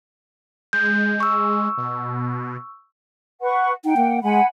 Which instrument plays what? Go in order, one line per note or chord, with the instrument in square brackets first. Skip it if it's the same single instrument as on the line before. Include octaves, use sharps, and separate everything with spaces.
[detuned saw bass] G#3 [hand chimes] G6
[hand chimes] C#6 E6
[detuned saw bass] B2
[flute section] B4 F#5 C#6
[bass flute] D#4 [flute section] F#5 G5
[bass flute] A#3
[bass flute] G#3 [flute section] F#5 G#5 B5